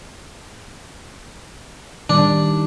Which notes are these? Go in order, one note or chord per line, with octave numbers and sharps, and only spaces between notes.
D#3 G3 D4 D#4